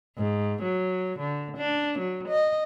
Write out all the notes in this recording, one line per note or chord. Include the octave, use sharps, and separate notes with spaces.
G#2
F#3
D3
D4
F#3
D#5